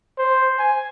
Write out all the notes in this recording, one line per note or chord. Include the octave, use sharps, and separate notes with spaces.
C5
G#5